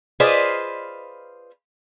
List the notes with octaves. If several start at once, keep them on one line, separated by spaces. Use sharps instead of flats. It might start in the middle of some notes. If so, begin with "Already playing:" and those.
F4 G#4 B4 C5 D5 D#5